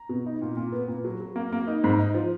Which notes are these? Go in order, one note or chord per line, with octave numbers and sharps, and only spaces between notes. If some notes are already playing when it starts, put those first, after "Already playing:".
Already playing: A#5
B2
D#4
A#2
A#2
B3
A#2
F#3
F#3
A#3
A#3
D#4
G#2
D#4
F3